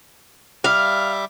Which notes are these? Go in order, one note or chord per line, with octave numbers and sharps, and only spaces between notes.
G3 E5 F5 D6